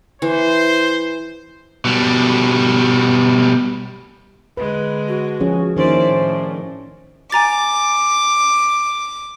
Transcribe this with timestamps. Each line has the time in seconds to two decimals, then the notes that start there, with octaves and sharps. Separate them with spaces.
0.22 E3 C5
1.85 B2 G3
4.57 D3 G#3 B4
5.08 F#4
5.40 F3 C#4 G#4
5.77 D#3 A#3 C#4 D4 E4 C5 D5
6.09 A2
7.32 G#5 A#5 D6 A6